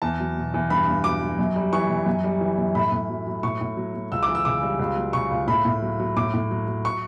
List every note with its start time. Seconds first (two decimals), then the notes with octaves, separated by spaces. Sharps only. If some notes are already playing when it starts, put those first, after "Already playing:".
0.02 E2 A5
0.20 F#3
0.37 B2
0.54 E2
0.70 G2 B5
0.87 G2
1.04 F#3 D6
1.22 F#3
1.39 F#2
1.56 G3
1.73 E3 C#6
1.90 F#2
2.06 F#2
2.24 G3
2.41 E3
2.58 F#2
2.75 A2 B5
2.92 A2
3.10 F#3
3.27 F#3
3.43 A2 C#6
3.61 A2
3.77 F#3
3.94 F#3
4.12 C#2 E6
4.23 D6
4.28 E3
4.35 E6
4.45 C#3 D6
4.63 G3
4.79 C#2
4.97 F#3
5.13 C#3 C#6
5.31 C#2
5.47 A2 B5
5.65 A2
5.82 F#3
6.00 F#3
6.17 A2 D6
6.34 A2
6.51 F#3
6.67 F#3
6.85 C#6